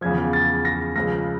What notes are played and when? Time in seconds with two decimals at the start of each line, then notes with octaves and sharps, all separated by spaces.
0.01 E2 C#3 F3 G#6
0.33 A6
0.65 A#6
0.96 C#2 C#3 F3 A#6